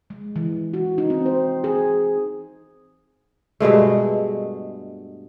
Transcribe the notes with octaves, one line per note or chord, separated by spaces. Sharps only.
G#3
E3
F#4
D#4
C4
C5
G#4
G2 B2 G#3 A3